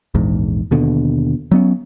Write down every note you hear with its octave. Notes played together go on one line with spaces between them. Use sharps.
A#1 E2 G#2
D#2 B2 D3
F#3 B3 C#4